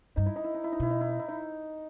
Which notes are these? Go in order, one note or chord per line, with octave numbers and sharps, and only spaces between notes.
G2 D#4
E4
D#4
E4
D#4
E4
D#4
B2 E4
D#4
E4
D#4
E4
D#4